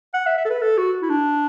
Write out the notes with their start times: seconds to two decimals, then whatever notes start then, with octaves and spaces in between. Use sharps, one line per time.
0.14 F#5
0.26 E5
0.38 E5
0.45 A4
0.50 B4
0.61 A4
0.77 F#4
1.02 E4
1.09 D4